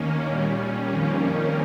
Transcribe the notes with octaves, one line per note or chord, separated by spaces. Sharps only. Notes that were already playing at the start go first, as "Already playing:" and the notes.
Already playing: D#2 D#3 A#3 C#4
A#2 G3 C#4
F2 D#3 G3 A#3 C#4